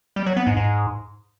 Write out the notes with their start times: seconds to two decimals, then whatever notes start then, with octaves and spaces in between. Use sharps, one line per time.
0.16 G3
0.26 F#3
0.37 B3
0.47 G#2
0.57 G#2